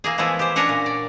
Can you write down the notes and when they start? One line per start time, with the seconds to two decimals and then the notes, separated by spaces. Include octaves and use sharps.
0.04 E3 A#3 G#4
0.18 E3 F3 G#3 B3 E4
0.39 G4 C5
0.56 C#4 D4 A#4 B4 C#5 F#5
0.69 A#2
0.86 D5